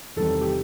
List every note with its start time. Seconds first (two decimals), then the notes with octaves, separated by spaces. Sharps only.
0.16 E2 C3 D#3 G3 A4
0.41 G4